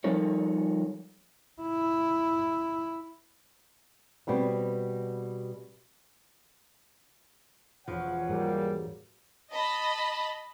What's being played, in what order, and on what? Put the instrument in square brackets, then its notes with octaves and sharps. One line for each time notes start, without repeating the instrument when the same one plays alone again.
[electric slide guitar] F3 G3 D#4 A4 A#4 C#5
[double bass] E4
[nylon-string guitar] B2 G3 B3 C4
[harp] E1 B5 [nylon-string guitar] F3 [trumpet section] C#4 C#5 F#5
[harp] G#2 F#3 G#4 [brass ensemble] G3 A#3
[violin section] D#5 A5 B5